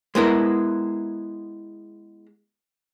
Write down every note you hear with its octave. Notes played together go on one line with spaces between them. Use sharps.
G#3 B3 E4 A#4